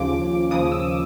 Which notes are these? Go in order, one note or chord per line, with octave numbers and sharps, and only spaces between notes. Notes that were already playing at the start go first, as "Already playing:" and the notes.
Already playing: D#2 C#3 F3 D6
D#2 C#3 F3 D#6
E6